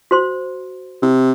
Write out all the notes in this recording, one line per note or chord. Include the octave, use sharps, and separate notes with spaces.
F#4 C5 C6
C3